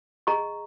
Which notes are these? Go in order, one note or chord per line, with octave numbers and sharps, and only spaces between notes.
G#4 D#5 A#5 C#6